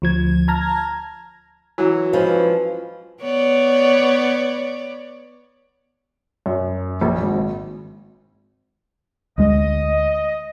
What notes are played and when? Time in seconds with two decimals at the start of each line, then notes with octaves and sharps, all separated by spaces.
0.02 D2 F3 G#6
0.48 A5 A#5 F6 G#6 A#6
1.78 E3 F#3
2.13 F3 G#3 C#4 B4
3.22 B3 C#5 D5
6.46 F#2
7.01 A#1
7.22 G#1
9.38 D2 G#3 D#5